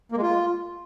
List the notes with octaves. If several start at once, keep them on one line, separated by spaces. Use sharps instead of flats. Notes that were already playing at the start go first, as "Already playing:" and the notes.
A#3
G#3
F4